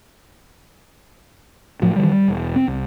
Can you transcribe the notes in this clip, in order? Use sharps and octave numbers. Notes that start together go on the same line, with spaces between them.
A2 F3 F#3
D#3 E3 G3
G3
E1
C4
C2